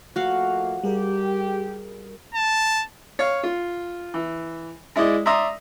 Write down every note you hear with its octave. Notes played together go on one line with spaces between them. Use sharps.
F3 A3 A#3 F#4 F5 F#5
G3 G4 G#4 A#4
A5
C#5 F5
F4
E3
G#3 E4 D5 D#5
D5 E5 A#5 C6 D#6